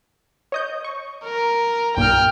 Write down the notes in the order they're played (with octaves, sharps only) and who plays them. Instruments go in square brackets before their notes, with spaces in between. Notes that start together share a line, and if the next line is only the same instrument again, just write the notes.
[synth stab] C#5 D#5 G6
C#6
[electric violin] A#4
[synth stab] B1 G2 A#2 [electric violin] G5 F6